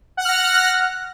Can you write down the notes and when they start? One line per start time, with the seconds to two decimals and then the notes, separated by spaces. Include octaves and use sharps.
0.17 F#5
0.21 F#6
0.25 F6
0.29 A#6